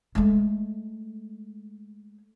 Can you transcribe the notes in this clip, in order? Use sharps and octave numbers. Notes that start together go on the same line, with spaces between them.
G#3 A3